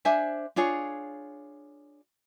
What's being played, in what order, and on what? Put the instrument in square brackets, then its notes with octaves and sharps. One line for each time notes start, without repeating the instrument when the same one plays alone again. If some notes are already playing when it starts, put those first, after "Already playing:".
[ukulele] D4 C5 E5 G#5
D4 F4 G#4 C#5